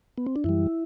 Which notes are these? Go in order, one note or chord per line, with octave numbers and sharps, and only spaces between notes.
B3
C4
D4
F#2 E3 G3 E4